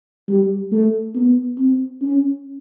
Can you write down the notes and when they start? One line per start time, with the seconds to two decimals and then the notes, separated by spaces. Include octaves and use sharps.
0.29 G3
0.72 A3
1.15 B3
1.58 C4
2.02 C#4